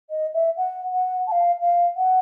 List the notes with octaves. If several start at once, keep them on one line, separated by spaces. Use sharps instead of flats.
D#5
E5
F#5
F#5
A5
F5
F5
F#5